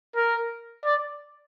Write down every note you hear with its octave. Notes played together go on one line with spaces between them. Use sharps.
A#4
D5